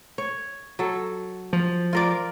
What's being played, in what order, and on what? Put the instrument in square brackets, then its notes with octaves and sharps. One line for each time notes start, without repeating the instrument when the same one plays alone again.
[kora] C#5
F#3 A4
[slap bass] F3
[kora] F4 A#4 D5